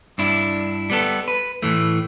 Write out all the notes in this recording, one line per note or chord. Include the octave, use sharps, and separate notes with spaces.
G2 D4 E4
G3 B3 A4
B4
A2 E3 A3